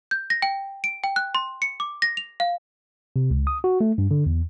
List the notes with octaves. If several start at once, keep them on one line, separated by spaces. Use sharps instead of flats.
G6
A#6
G5
D7
G5
F#6
C6
C#7
D6
A#6
F7
F5
C3
C#2
D#6
F#4
A3
G2
D3
E2